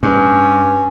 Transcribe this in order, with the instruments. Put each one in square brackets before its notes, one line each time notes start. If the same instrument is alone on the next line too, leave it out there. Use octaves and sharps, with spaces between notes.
[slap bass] G2 [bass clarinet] C#4